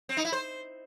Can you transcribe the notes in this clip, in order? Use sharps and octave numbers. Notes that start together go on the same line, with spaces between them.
C4
D#4
E4
C5